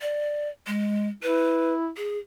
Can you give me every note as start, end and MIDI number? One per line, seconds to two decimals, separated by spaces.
0.01 0.49 74
0.67 1.07 56
1.23 1.90 64
1.23 1.73 71
1.97 2.18 68